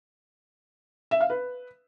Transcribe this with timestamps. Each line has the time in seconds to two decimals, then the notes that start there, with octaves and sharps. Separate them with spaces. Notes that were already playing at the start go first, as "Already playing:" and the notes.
1.11 E5
1.21 F5
1.30 B4